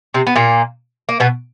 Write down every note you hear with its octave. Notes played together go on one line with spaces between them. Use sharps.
C3 C4
B3
A#2 A#3
A#3
B2 B3